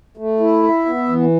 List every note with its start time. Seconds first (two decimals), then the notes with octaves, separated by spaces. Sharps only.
0.17 A3
0.40 E4
0.63 E5
0.86 B3
1.09 E3